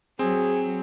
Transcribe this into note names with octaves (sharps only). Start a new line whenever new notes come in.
F#3 C4 G#4